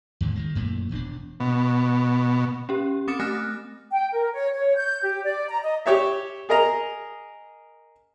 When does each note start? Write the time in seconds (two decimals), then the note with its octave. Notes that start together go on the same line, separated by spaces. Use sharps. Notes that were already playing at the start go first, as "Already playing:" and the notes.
0.21 D#2 G#2 D3
0.35 D#3 F#3 G#3
0.55 F#2 A#2 E3 A3
0.91 E1 E2 C#4 D4
1.40 B2
2.69 C#4 G4
3.08 C4 D6 D#6 A6 C#7 E7
3.20 A3 C4 D#6 F6 F#6 A#6
3.91 G5
4.13 A#4
4.34 C#5
4.54 C#5
4.76 G6
5.02 G4
5.23 D5
5.49 A#5
5.62 D#5
5.86 G4 C#5 E5
6.49 G#4 A#4 D#5 A#5